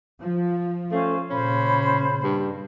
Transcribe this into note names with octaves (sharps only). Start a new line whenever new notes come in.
F3
A3 C#4 C5 F5
A#2 C#3 C#4 C5 B5
G2